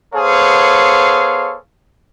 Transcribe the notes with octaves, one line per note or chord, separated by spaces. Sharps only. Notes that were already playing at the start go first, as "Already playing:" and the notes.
B3 G#4 A4 C5 C#5 F5